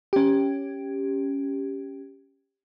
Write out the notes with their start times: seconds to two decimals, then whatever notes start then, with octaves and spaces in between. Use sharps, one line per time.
0.13 C#4 G4